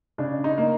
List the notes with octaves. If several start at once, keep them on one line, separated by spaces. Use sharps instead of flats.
C#3 D4
D#4
A#3